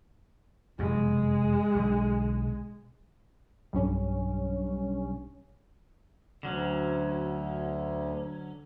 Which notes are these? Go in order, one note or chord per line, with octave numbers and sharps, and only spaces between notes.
F1 F#2 B2 G#3
B1 D3
B1 G2 C#4
D2 D3 F#3 C#4